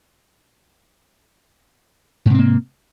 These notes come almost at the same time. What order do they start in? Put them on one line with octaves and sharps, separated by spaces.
G#2 C3 C4 A#3